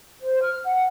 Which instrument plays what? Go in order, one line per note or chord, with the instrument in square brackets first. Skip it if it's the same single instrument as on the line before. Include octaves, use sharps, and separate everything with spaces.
[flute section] C5
F6
F#5